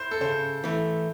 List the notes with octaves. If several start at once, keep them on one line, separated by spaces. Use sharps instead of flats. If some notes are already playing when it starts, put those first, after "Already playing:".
Already playing: E4 C5
A4
C#3 C5
E3 A3